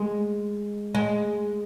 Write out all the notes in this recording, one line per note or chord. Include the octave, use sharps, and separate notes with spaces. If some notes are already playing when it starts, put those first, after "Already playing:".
Already playing: G#3
G#3